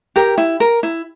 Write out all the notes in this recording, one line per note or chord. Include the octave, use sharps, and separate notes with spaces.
G4 A#4
E4
A#4
E4